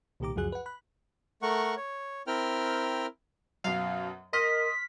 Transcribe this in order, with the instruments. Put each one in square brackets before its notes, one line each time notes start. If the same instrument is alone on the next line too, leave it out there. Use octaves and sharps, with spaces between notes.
[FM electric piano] C2 A#2 D#3 G4 A#5 D6
C#2 F#2 F3 F#4 G#4 F#6
B4 F#5
B5 F#6
[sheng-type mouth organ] A3 A#4 F#5 C#6
C#5
C4 E4 A#4 G5 F6
[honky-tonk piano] F#2 B2 [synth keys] F5
[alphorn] A#4 [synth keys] D#5 [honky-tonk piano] C6 F6 [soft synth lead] B6